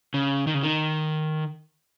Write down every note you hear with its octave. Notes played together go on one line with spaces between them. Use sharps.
C#3
D#3
C#3
D#3